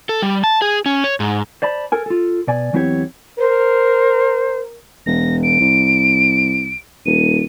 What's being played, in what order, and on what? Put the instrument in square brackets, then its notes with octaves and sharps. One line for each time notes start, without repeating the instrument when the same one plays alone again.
[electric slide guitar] A4
G3
A5
G#4
C#4
C#5
G#2
[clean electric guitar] C5 D5 A5 B5
A4 A#4 G#5
F4 A4
B2 D5 G#5
E2 F#3 C4 E4 G4 C#5
[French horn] A#4 [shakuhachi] C5
[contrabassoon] E1 [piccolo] A#6
[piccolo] D7
[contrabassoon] C2
[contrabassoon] D#1 [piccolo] D#7